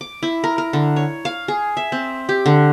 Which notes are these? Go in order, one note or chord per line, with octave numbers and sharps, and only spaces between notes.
D6
E4
A#4
A#4
D3
C#5
F5
G#4
E5
C4
G4
D3